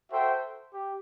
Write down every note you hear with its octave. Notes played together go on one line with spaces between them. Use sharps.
F#4 A4 C5 E5 G5
G4